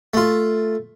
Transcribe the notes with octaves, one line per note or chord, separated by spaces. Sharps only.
A3 F4